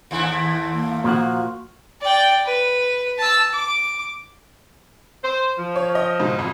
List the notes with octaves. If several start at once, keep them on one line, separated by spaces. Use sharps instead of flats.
D#2 A2 E4
A#3
A#2 F3 A#3 F#4
D5 G5
B4
A5 E6
D6
C5
F3
C#5
D#5
G#2 B2
F2